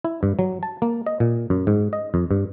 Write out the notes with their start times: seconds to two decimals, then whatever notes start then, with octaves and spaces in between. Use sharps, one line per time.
0.04 E4
0.23 G2
0.39 F#3
0.63 A5
0.82 A#3
1.06 D#5
1.20 A#2
1.50 F#2
1.67 G#2
1.93 D#5
2.14 F2
2.31 G2